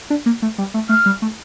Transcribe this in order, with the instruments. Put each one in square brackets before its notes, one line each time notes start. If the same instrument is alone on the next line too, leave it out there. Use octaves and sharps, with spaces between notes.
[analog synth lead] D4
A#3
A3
G3
A3
[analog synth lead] A3 [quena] F6
[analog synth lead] G3
A3